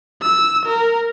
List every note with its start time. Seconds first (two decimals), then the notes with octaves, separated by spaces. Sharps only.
0.22 E6
0.66 A#4